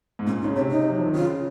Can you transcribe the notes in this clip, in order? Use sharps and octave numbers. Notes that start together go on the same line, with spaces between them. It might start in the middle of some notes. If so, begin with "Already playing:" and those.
G#2
A#2 C#4
D#4
C#3
C3 C#5
D#4
F#3
F3
D#3
C#3 F4